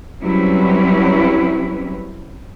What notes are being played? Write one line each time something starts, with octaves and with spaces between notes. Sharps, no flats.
F#3 G3 C4 C#4 E4 B4